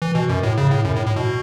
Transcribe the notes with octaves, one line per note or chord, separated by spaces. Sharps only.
E3
B2
F#2
A2
C#3
A2
F#2
A2
A2
B2